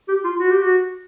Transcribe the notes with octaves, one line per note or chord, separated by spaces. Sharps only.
G4
F4
F#4
G4
F#4